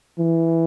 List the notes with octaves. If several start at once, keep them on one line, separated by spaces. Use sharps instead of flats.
E3